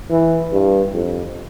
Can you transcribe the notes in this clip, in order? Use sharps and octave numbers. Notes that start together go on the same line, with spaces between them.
E3
G2
F2